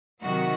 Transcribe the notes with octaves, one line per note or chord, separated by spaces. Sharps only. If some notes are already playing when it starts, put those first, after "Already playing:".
C3 D#3 F#3 F#4